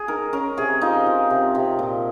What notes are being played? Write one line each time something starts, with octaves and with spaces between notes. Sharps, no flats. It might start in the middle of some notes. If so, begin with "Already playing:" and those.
Already playing: G#4
D#3 A#4
C#4 A#4
C3 G#4
F3 D#4
F3
C3
C3
A#2